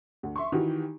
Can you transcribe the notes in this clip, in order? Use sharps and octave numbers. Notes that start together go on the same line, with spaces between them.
D2
E5 C6 C#6
D#3 E3 F#4 G4